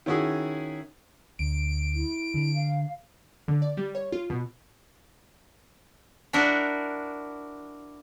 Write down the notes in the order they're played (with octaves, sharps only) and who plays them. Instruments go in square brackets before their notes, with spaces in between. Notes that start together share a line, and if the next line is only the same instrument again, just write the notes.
[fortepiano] D#3 C#4 E4 F#4 G#4
[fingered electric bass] D2 [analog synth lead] D7
[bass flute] E4
[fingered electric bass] D3
[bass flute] F5
[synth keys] D3
D5
G3
C#5
F4
B2
[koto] D4 E4 F#4 A#4